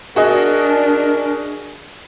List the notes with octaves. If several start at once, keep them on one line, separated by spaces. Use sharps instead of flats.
D4 F#4 G#4 A#4 D#5